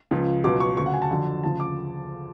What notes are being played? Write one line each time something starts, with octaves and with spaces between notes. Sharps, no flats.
C#2 C#3 F3
C#2 B2 F#3 D6
C#6
D2 C#3 F#3 C#6
F#5
G#5
A5
F2 D3 F#3
D2 C#3 F3 A5
D6